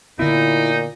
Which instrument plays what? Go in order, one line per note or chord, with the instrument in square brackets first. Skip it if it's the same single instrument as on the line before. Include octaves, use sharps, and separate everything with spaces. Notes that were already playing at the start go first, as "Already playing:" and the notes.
[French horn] A#2 [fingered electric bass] D3 B3 [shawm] D#4 [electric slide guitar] E4